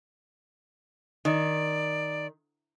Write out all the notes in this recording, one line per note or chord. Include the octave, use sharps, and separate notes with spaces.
D#3 D5